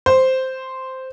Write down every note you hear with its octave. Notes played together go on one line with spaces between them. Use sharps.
C5